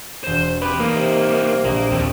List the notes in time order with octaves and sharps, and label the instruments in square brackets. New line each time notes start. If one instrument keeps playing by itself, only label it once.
[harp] E1 E7 [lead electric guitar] C5
[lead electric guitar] C4 G4 [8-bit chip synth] B4 [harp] D#6
[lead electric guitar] G3 D#4 [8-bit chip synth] A#3
[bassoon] C3
[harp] A#1 D#5 [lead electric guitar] A#3 A#5
[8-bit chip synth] D#2 [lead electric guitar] C4 D4